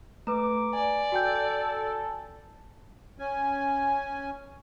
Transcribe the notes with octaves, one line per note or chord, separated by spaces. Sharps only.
A3 B4 A#5 D6
D5 G#5
F#4 A4 G5 G6
C#4 G#5